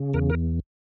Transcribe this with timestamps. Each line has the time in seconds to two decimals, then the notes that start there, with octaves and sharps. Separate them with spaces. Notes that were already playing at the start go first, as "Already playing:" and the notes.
Already playing: C#3
0.14 E2 A#4
0.30 A#4